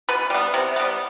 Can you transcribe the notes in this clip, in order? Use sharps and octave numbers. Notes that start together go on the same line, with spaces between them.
B2 B4
G3 B3
C3
G3 B3